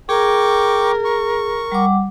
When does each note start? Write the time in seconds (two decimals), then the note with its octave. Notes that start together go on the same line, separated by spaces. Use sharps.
0.09 G#4 A#4 G5 C#6 D6
1.05 C#6
1.72 G3 F#5 D6